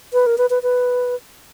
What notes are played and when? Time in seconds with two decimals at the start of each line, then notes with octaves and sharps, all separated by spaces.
0.13 B4
0.26 A#4
0.38 B4
0.50 B4
0.63 B4